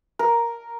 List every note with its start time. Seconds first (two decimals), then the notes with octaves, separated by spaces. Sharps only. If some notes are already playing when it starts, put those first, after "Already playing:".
0.19 A#4